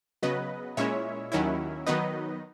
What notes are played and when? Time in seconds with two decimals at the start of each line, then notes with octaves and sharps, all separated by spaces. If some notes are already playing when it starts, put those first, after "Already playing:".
0.23 C#3 F#3 B3 B4 D#5
0.77 A#2 G#3 C#4 E4 C#5 E5
1.32 D#2 D#3 F#3 C#4 E4
1.87 D#3 F#3 B3 D#4 B4 D#5